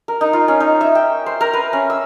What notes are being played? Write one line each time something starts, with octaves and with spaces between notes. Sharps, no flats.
A#4
D#4
F4
C#4
D#4
E5
G5
C5
A#4
B4
C#4
E6